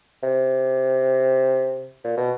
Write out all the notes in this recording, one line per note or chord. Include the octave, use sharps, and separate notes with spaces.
C3
A#2
B2